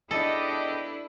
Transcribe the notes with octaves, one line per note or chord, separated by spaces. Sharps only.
G#2 B3 D4 E4 G4 A4 D#5